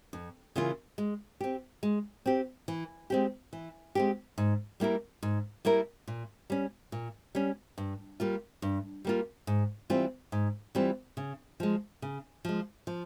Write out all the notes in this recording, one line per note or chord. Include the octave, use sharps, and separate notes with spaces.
F2
C#3 E3 A#3 F4
G#3
C4 G4
G#3
C4 G4
E3
G#3 C4 G4
E3
G#3 C4 G4
G#2
G3 A#3 E4 A#4
G#2
G3 A#3 E4 A#4
A#2
G3 C#4
A#2
G3 C#4
G2
G3 A#3 F4
G2
G3 A#3 F4
G#2
E3 G3 C4 F4
G#2
E3 G3 C4 F4
C#3
F3 G#3
C#3
F3 G#3
F3